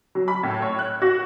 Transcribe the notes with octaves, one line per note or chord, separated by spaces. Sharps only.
F#3
B5
A2
C#5
F#6
F#4